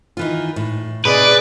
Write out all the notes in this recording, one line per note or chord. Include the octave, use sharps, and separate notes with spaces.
D#3 E3 F4
A2
C3 D#4 G#4 B4 D5